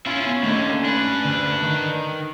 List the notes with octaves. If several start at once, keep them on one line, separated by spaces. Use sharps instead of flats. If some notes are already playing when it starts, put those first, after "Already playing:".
C#4 E4 F4 F6
B3
D#2 D3 A3
D4 B4
D2 D3
D#3